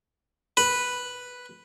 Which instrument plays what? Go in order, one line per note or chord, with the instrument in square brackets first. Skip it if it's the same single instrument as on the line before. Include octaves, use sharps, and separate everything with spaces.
[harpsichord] B4